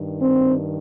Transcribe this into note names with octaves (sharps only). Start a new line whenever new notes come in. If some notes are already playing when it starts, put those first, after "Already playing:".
Already playing: G2 D#3
C4